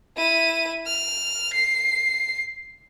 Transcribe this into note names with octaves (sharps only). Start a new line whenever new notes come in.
E4 D#7
F6
C7